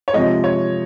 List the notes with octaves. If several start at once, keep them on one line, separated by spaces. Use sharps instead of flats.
C#5
C3 F3 G#3 D#5
C#5